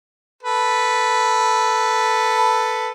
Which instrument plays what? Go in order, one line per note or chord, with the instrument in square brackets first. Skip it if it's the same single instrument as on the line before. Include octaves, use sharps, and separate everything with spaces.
[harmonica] A4 B4